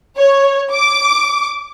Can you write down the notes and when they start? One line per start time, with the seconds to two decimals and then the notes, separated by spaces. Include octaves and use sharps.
0.17 C#5
0.72 D6